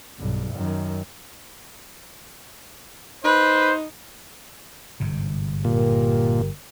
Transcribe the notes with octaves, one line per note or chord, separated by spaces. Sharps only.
B1 G2
F#2 D#3
D#4 B4 C5
G1 G#2 C3
A#2 G4 A#4